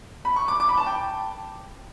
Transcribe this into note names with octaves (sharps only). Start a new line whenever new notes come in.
B5
C#6
D6
D6
B5
A5
G5